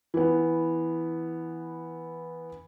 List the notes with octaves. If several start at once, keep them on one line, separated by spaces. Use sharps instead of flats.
E3 B3